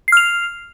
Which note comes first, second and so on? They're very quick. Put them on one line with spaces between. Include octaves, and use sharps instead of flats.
C7 F6 F7